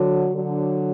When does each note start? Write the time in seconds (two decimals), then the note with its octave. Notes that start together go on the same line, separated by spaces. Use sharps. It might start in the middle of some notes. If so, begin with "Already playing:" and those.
Already playing: D3 F#3
0.34 D3 F#3